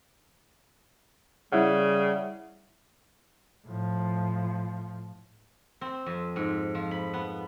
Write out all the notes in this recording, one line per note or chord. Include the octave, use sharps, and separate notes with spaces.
C#3 G3 E4 E5 F#5
A2 F3
C4
F2
G#2
F3
B5
B3